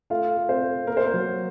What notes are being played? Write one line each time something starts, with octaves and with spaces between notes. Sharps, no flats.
A3 F4 F5
A3
C4 C5
A3
A#3 A#4
C5
A#3 A#4
F#3